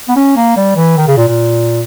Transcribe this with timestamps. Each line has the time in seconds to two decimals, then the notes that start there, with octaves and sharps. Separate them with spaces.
0.09 B3
0.16 C#4
0.37 A#3
0.56 G3
0.77 E3
0.97 D#3
1.08 C#3
1.17 A#2
1.28 A#2